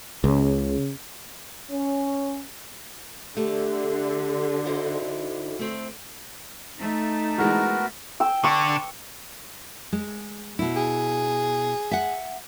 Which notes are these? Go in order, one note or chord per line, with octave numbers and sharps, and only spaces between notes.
C#2 C#3
C#4
D3 A3 G4
D#4 E4 F#4 C5
A3 C4
A3 D#4
E3 G#3 B3 F#4 A#4
G5 E6
D3 C#6
G#3
B2 E4
G#4
E5 F#5